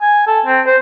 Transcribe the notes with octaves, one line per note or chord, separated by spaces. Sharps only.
G#5
A4
C4
C5